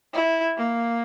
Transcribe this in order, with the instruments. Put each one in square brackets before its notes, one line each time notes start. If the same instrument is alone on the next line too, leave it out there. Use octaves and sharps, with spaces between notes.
[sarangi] E4
A#3